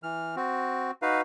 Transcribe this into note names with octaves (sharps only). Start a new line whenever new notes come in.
E3 F6
C4 F#4
D#4 F#4 B4 F5